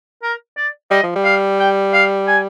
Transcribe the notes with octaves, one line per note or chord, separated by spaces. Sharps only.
A#4
D5
G3 D#5
F3
G3
F5
G5
F5
G#5